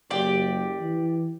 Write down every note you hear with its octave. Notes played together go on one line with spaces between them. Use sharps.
F#1 G4 D5
E3